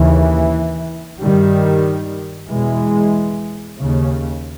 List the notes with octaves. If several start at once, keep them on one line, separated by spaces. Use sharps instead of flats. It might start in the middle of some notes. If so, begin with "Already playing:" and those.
Already playing: D#2 C#3 E3
G2 D#3 G3
E2 B2 E3 G#3
D#2 C#3